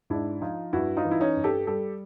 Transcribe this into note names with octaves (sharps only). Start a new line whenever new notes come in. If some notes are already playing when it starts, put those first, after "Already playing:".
G#2 D4 E4
F3 D#4 F4
G2 E4 F#4
D#4 F4
E3
E4
C#4 D#4
G2
G4 A4
G3 G4 A4